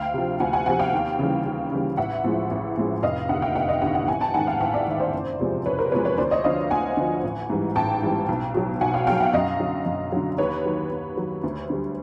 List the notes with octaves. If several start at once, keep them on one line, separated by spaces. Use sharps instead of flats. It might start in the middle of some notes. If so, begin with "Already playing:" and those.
Already playing: D2 F5 G5
C3 F3
D2 F#5 G#5
F#5 G#5
C3 F3 F#5 G#5
F5 G5
D#2
C#3 E3 G3
D#2
C#3 E3 G3
A1 E5 F#5
A2 F3 G#3
A1
A2 F3 G#3
F1 D#5 F5
D#2 D3 E5 F#5
F5 G5
F1 E5 F#5
D#5 F5
D#2 D3 E5 F#5
E5 F#5
A1 F#5 G#5
G5 A5
G#2 D#3 F#5 G#5
F5 G5
A1 E5 F#5
D5 E5
G#2 D#3
C5 D5
F#1
E2 C3 F3 G#3
F#1 B4 C#5
A#4 C5
E2 C3 F3 G#3 B4 C#5
B4 C#5
D2 C5 D5
C#5 D#5
D3 F3 D#5 F5
D2 F#5 G#5
D3 F3
A1
G#2 E3 G3
A1 G5 A5
G#2 E3 G3
B1
B2 F#3
B1 F#5 G#5
F5 G5
B2 F#3 F5 G5
E5 F#5
F#2 D#5 F5
D3 F#3
F#2
D3 F#3
D#2 B4 C#5
D#3 F#3
D#2
D#3 F#3
D2
D3 G3